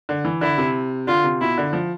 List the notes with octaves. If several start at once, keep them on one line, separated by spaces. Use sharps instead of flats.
D3
E3
D3 E4
C3
D3 F4
C3
B2 E4
D3
F3